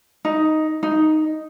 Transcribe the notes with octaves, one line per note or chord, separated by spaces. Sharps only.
D#4
D#4